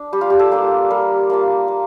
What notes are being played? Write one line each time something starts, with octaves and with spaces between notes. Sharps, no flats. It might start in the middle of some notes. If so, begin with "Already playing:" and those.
Already playing: D4
G3 G4
F4
G4
A4
A#3 D4 F4
G3 A#4
A#3 D4 F4
A#3